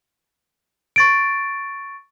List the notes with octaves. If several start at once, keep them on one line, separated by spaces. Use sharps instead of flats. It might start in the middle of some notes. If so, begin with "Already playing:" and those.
C#6 A6 D7